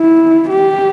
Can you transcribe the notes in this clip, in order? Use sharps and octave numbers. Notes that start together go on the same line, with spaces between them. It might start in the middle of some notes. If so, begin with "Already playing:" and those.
Already playing: E4
G4